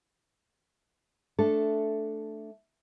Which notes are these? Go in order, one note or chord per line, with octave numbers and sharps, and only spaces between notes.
A3 D4 A4